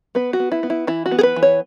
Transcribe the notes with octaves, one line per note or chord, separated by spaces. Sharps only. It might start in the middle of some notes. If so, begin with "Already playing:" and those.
B3 B4
F#4
B3
E4
B3
E4
E3 E4
F#4
B3
G#4
B4
E3
C#5